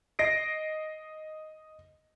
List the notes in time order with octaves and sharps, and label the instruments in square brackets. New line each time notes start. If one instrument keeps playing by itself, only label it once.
[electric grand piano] D#5 A#6 C7 D7